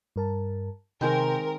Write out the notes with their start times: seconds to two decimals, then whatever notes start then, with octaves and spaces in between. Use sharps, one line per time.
0.16 G2 A#4 A5
1.01 C3 D#3 G#3 C4 A#4 G6